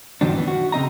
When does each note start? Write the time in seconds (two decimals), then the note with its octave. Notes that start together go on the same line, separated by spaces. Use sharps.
0.21 F#2 A#2 D#3 F3 F#3 D4
0.35 E3 B3
0.48 F#4
0.72 C#3 C4 D#5 A#5